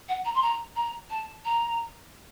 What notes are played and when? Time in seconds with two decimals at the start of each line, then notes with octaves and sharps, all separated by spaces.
0.09 F#5
0.25 A#5
0.35 C6
0.42 A#5
0.76 A#5
1.10 A5
1.45 A#5